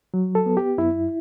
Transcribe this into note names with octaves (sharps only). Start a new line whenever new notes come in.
F#3
A4
B3
G4
F#2 E4